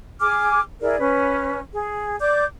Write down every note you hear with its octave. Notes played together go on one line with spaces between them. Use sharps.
G#4 G#5 D6 F6
E4 G#4 A#4 D5
C#4 B4
G#4
D5 D6 G6